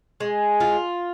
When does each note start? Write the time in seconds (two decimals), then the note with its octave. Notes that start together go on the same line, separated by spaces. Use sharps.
0.20 G#3
0.60 F4